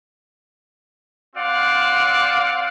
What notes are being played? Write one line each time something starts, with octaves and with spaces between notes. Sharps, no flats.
C4 F4 D5 F5 F#5